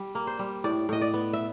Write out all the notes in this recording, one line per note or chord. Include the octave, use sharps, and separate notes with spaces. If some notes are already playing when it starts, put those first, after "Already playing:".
Already playing: G3
A#3
C5
G3
A2 D5
A2 D#5
D5
B3
E5